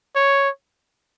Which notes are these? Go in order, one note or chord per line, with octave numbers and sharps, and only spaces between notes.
C#5